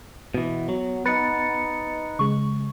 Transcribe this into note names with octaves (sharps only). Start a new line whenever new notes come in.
B2 E3 B3
F#3
D#4 B4 A6 C#7
C#3 G#3 C#6